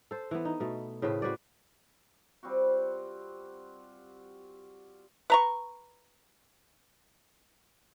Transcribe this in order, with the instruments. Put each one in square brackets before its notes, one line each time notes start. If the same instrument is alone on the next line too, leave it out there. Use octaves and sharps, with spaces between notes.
[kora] A4 C5
E3 B3
D#4
B2 A3
A2 C#3 C4 B4
F#4 B4 C5 D5
[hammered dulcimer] G3 C4 F4 F#4
[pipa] B4 A#5 C#6